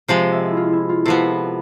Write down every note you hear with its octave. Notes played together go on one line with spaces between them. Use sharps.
C3 F3 G#3 C5
E5
E5
E4
F4
E4
F4
C3 F3 B3 A4
B4